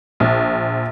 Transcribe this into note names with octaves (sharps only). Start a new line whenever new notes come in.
A#1